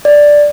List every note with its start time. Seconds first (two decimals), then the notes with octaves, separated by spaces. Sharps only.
0.05 D5